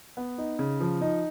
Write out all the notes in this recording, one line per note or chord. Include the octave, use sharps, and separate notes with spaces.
B3
D#4
C#3
F3
D#4